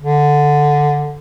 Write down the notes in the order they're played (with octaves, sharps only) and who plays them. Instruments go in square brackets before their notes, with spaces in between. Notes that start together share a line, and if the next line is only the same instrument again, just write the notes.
[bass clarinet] D3